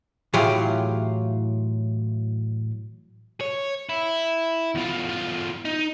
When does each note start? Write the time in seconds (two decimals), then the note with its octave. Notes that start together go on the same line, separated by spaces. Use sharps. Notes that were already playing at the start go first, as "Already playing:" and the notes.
0.34 A2 E3 F#3 F4 G4 G#4
3.41 C#5
3.89 E4
4.75 E2 F4
5.09 E2 F4
5.65 D#4